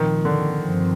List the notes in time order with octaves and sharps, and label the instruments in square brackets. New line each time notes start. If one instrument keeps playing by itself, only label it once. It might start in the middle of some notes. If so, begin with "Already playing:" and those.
Already playing: [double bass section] A#2 F3 C4 [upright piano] D#3
[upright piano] D3
[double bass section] G2 F3 C4